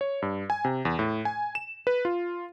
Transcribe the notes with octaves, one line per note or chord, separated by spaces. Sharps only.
C#5
G2
G#5
C3
E2
A2
G#5
E7
B4
F4